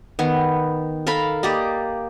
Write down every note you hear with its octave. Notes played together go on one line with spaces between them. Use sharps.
D#3 B3
A4 A#4 F5 B5
A#3 G4 D5 D#5